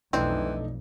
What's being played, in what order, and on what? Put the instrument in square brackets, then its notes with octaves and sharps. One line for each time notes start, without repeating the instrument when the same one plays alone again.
[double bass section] B1 F2 [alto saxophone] E3 [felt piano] A3 D4 D#4 [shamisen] C4